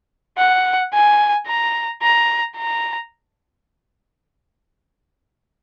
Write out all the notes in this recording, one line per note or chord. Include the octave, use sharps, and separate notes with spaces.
F#5
G#5
A#5
A#5
A#5